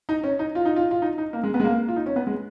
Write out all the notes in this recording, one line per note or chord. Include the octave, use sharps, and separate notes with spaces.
D#4
C#4
D#4
F4
D#4
F4
F4
D#4
D#4
A#3
G#3
B3
G#3
A#3
F4
D#4
C#4
B3
G#3